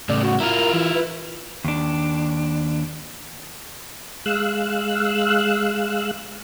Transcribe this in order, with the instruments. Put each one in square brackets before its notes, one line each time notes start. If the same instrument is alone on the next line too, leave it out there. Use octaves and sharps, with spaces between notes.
[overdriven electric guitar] A2 C#3 [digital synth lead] D5
[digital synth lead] F#4
[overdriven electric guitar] E4 F4 [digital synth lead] A#4
[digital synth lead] E3
B4
[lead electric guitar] D#2 D4
[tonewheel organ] G#3 F5 E6 F#6